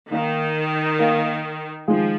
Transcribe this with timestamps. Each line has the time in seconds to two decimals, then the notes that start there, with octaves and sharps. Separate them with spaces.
0.10 D#3 A#3 D#4 A#4 F5
0.99 A#3 D#4 A#4 F5
1.88 D#3 F3 G#3 F4 G#4